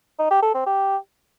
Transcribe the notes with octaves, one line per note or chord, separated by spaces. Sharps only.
D#4
G4
A4
C4
G4